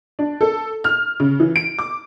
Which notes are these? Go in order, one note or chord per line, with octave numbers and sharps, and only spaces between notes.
D4
A4
F6
C#3
E3
D7
D6